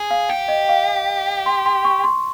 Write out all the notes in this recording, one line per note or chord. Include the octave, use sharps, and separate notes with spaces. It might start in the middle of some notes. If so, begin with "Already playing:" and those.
Already playing: G#4
F5
G4 G5
D#5
F5
C6
C6
C#6
C6